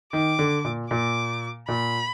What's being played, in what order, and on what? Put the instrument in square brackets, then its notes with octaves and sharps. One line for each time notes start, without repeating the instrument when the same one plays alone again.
[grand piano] D#3 [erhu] D6
[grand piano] D3
A#2
[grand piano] A#2 [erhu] D6
[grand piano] A#2 [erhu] B5